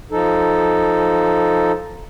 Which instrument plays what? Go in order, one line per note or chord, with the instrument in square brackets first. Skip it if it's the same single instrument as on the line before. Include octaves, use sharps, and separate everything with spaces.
[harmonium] F3 D#4 A4